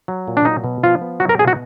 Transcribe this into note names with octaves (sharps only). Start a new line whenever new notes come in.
F#3
A#2
D4
F#3 D#4
B2
F3 F4
B3
F#3 F#4
A#4
B2 G#4
F#4